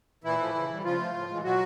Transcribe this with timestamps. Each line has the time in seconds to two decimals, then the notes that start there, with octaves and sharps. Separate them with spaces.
0.24 A#2 E3 E4
0.39 F3 A3
0.54 C#3
0.68 E3 G3
0.84 C#3 F3 F4
0.99 F3 A3
1.14 A2
1.29 E3 G#3
1.43 B2 F#3 F#4